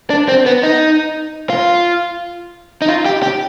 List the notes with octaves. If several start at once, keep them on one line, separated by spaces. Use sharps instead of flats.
D4
C4
B3
D#4
F4
D#4
F4
G4
G4